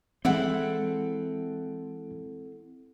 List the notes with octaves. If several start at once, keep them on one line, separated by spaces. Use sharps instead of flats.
E3 G#3 C4 E4 A4 F#5